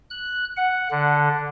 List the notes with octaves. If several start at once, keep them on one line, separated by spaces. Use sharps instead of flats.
F#6
F#5
D3